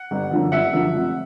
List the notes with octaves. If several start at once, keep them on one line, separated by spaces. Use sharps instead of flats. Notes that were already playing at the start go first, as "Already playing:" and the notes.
Already playing: F#5
G1
F#2 D3 F3
G1 E5 F#5
F#2 D3 F3
F1